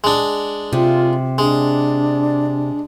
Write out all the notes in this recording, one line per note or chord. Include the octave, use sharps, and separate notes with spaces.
G#3 D4
C3 F4
G#3 D4